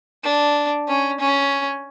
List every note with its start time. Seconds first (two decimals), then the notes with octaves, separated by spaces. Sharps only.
0.23 D4
0.88 C#4
1.20 C#4